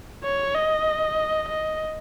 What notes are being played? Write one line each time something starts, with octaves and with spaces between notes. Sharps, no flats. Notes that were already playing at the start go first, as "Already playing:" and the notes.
C#5
D#5
D#5